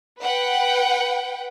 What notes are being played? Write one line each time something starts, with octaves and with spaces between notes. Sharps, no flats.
B4 F#5 G5